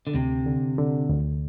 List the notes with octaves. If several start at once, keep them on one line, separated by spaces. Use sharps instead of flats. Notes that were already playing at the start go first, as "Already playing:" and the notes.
D3
D2 C3
D3
D3
D2